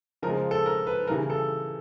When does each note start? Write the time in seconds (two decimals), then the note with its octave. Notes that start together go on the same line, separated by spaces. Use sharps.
0.22 C#3 F3 G#3 A#4
0.51 A4
0.66 A#4
0.87 B4
1.07 C#3 E3 G3 A#4
1.30 A4